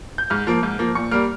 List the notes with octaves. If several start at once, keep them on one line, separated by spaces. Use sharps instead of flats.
G6
G#2 F6
F3 A#3
G#2
F3 A#3
A#2 C#6
G3 A#3 F6